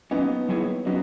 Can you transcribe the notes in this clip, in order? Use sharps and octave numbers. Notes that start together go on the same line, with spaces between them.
F#3 A#3 B3 C#4 D#4
F#3 A#3 E4 G#4 C#5
F#3 B3 C#4 D#4